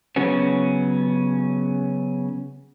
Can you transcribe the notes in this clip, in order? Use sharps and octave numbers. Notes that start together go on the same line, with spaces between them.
C#3 F#3 B3 C#4